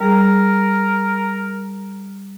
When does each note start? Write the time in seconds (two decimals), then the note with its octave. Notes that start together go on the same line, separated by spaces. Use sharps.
0.01 G3 G#4 A#4